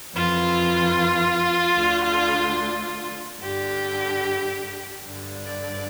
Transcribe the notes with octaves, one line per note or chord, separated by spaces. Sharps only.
F2 E3 F4
D2 D3
G2 D3 G4
G2 D3
D5